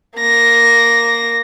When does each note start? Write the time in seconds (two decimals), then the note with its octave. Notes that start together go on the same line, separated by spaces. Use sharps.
0.19 A#3 A#6